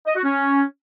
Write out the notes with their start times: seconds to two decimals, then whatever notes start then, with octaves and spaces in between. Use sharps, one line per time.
0.06 D#5
0.15 F#4
0.24 C#4